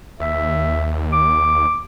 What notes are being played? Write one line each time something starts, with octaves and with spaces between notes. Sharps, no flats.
D#2 E5
D6